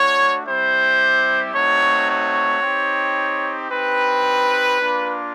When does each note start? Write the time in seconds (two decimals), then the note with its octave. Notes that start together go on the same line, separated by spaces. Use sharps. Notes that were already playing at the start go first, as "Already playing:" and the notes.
Already playing: A3 D4 F#4 C#5
0.46 G3 C4 E4 G4 C5
1.55 A3 C4 D#4 F#4 C#5
2.09 C#5
2.62 C4 D#4 G4
3.71 C4 D#4 G4 B4
4.79 A#3 D4 F4